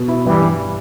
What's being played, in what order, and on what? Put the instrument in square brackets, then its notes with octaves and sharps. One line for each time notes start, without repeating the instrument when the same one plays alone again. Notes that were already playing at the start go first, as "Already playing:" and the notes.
Already playing: [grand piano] B2
E4
[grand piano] G2 [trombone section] E3 G3
[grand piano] G2